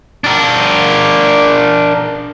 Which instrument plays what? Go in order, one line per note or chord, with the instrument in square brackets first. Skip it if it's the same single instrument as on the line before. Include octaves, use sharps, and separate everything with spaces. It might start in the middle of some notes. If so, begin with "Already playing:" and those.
[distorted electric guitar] D4 A#4